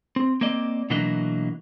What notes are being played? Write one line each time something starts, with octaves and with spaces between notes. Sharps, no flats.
C4
A#3 C4 D5 D#5
B2 E3 F#3 A#3 D4 D#5